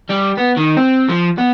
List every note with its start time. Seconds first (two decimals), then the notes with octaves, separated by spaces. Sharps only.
0.10 G3
0.38 B3
0.57 D#3
0.77 C4
1.09 F3
1.38 B3